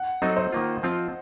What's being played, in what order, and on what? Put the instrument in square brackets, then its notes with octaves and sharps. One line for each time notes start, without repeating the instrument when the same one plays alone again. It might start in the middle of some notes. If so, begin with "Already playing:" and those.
Already playing: [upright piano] F#5
[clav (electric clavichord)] F#3 C4 D#4 A4 [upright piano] D#5
[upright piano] C5
[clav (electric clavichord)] D#3 A#3 F4
F3 C4 F4